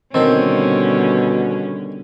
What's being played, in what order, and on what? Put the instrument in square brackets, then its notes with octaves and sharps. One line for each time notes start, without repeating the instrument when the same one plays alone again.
[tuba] B2 [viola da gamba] D3 G3 C#4 [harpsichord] D#3 A4 C5 [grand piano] C4